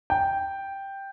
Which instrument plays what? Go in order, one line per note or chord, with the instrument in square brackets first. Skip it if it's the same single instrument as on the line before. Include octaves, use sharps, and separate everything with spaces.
[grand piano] G5